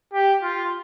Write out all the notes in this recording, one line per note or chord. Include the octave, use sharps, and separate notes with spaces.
G4
F4